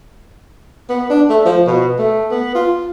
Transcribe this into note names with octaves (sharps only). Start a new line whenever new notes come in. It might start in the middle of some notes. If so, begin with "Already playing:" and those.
B3
D4
A3
F3
B2
A3
B3
F4